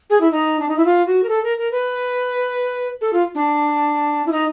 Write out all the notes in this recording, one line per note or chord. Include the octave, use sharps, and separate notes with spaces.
G#4
E4
D#4
D4
D#4
E4
F4
F#4
A#4
A4
A#4
A#4
B4
A4
F4
D4
E4
D#4